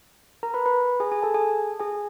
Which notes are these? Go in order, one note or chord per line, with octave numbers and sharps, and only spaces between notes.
A#4 A#5
B4 B5
B4 B5
G#4 G#5
G#4 G#5
A4 A5
G#4 G#5
G#4 G#5